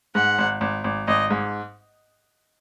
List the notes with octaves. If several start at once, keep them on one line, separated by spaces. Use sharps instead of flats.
G#2 F#5
G#1
G#1
G#1
G#1 D#5
G#2